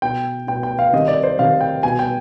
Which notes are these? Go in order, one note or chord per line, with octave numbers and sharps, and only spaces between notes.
B2 G5
B2 G5
G5
F5
C3 D#3 D#5
D5
C5
C3 D#3 F5
G5
B2 G#5
G5